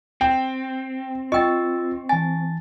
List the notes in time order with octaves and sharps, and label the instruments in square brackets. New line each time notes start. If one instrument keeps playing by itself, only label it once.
[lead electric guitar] C4 [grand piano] G5
[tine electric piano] F4 E6 A6 [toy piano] D#5 G5 [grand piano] C#6
[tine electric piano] E3 A5 A6 [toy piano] G#5